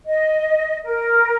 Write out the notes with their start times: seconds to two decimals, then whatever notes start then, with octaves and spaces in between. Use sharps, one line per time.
0.06 D#5
0.85 A#4